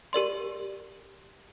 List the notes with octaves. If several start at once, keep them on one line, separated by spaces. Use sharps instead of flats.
G4 A#4 D5 C6